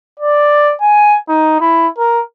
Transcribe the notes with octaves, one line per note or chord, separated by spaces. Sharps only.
D5
G#5
D#4
E4
A#4